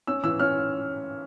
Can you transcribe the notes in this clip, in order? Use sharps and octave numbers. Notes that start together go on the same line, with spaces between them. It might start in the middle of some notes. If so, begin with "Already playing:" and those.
C#4 E6
E3 E6
C#4 F6